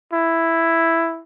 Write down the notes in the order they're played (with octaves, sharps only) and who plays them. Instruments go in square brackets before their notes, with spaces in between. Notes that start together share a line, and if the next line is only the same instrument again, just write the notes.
[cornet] E4